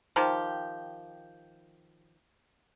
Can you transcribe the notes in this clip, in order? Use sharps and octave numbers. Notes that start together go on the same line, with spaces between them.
D#3 F3 G4